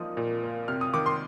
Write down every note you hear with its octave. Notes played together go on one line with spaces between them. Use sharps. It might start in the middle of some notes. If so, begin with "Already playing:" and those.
Already playing: A#2 F3 A#3 D#4 D#6
A#2
A#3
C3 F6
D#6
D#3 D6
C6